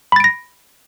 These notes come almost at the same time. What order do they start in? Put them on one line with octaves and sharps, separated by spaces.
B5 A6 D7 A#6